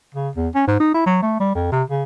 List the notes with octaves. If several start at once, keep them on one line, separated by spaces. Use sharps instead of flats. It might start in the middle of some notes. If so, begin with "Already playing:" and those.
C#3
E2
C#4
G#2
D#4
E4
F#3
A3
G3
F2
C3
C#3